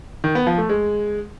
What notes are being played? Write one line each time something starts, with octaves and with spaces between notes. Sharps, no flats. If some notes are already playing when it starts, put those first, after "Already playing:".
D#3
B3
F3
A3
G#3